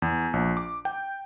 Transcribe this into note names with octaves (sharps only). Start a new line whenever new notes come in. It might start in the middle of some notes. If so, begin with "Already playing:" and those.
E2
A#1
D6
G5